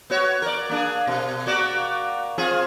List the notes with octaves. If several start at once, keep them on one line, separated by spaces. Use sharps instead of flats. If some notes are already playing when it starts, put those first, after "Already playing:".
B3 F#4 C#5
A#4 D5
A#3 D4 G#4
B2
A#3 F#4 D5
C4 F4 G#4